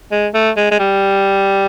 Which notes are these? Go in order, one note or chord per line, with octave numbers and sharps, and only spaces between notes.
G#3
A3
G#3
G#3
G3